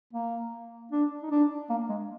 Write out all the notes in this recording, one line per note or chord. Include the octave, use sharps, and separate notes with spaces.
A#3
D4
D#4
D4
A#3
G#3